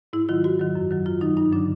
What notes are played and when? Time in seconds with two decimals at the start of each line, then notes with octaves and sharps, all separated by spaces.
0.13 G#2 E4
0.29 D#3 F#3 F4
0.44 G#2 F#4
0.60 D#3 F#3
0.75 F#2
0.90 D#3 F#3
1.06 F#2 F4
1.21 D#3 F#3 D#4
1.37 G2 D#4
1.52 D3 F#3 D4